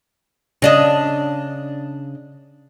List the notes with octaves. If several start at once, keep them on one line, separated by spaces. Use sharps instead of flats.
C#3 D4 D#5